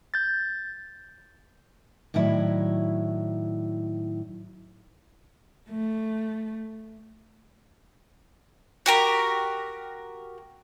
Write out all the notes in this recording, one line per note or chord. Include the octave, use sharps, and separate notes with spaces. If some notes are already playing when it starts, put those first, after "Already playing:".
G6 A6
A2 D#3 F#3 E4 D5
A3
F#4 G4 A#4